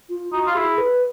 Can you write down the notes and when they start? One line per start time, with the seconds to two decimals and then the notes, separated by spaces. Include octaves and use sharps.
0.09 F4
0.32 D#4 F#4
0.47 F4
0.55 E4 G#4
0.78 B4